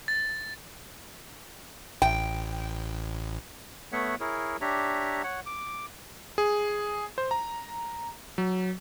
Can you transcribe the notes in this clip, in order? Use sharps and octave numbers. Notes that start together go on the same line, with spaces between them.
A6
A1 G5
A3 B3 C#5 E5 F#5
E4 G#4 A#4 C#5
D4 G4 C#5 E5 A#5
C#5 F#5
D6
G#4
C5
A#5
F#3